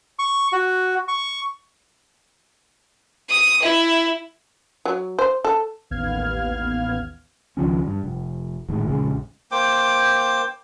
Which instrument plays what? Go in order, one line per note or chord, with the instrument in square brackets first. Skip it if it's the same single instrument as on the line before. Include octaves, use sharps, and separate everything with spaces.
[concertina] C#6
F#4
C#6
[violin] D#6
E4
[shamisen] F#3
C5
A4
[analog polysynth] A1 D#2 B3 F5 F6 G#6
[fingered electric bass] C#2 D#3 F3 C#4
G2
F1
D#1 A2 D#3 G#3
A#1 F2 C#3 G#3
[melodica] A#3 C5 G5 D6